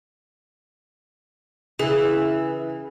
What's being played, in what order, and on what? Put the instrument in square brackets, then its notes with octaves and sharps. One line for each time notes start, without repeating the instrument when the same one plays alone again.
[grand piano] C#3 [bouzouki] E3 [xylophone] G#4